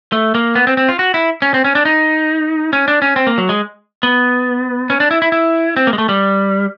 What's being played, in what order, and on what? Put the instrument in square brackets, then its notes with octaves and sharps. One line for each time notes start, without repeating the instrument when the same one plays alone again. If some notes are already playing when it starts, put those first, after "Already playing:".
[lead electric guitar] A3
A#3
B3
C4
C4
F4
F#4
E4
C#4
C4
C#4
D4
D#4
C#4
D4
C#4
C4
A#3
F#3
G#3
B3
C#4
D4
E4
E4
E4
C4
A#3
G#3
A3
G3